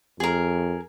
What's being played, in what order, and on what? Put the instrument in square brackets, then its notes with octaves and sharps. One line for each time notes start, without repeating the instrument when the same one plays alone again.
[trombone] F2 [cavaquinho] G#4 A#4